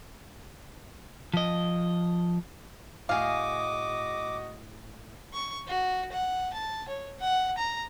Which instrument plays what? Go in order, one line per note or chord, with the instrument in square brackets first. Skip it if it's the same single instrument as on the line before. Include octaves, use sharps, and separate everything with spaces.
[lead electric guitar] F3 D#5
[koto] A2 G#4 [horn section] F#4 D#5 [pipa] F5 [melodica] D6
[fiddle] C#6
F#4
F#5
A5
C#5
F#5
A#5